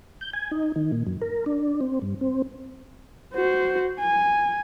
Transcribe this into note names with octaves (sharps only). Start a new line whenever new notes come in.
G6
G#5
D#4
D#3
A#2
F#2
A#4
D4
C4
G2
C4
F#4 C5
G#5